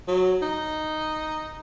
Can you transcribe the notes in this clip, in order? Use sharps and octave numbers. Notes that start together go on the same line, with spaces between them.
F#3
D#4